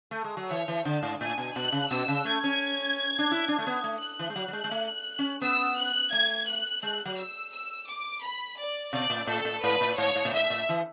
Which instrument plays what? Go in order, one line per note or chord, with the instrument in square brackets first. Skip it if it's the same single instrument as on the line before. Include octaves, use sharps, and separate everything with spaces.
[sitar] A3
G#3
F#3
[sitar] E3 [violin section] C#5
[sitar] E3
[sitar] D3 [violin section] A5
[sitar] G#2
[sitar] A2 [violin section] G#5
[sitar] B2
[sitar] B2 [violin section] F#6
[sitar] C#3
[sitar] B2 [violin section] E6
[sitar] C#3
[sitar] A3 [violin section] G#6
[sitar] C#4
D4
E4
D4
A3
B3
A3
[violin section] F#6
[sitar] E3
G#3
[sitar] F#3 [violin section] F#6
[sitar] F#3
G#3
G#3
A3
C#4
[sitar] B3 [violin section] E6
[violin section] F#6
[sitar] A3 [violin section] G#6
[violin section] F#6
[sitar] G#3 [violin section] F#6
[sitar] F#3
[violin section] E6
E6
D6
B5
D5
[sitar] B2 [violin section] D5
[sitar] A2
[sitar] A2 [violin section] A4
[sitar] A2
[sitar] G#2 [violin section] B4
[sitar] A2
[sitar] G#2 [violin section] C#5
[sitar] G#2
A2
[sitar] G#2 [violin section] E5
[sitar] A2
E3